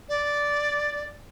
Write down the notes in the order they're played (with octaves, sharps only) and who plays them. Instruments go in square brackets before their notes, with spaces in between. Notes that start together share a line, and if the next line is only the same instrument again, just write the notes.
[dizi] D5